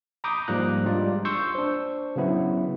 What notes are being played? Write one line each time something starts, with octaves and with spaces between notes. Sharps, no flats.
A#5 B5 D6 D#6 G6
G#2 F3 G3 A#3 A#5 F#6
G3 G#3 D4 F4 D5
C6 C#6 E6 G6
D4 C5
C#3 F#3 B3 E4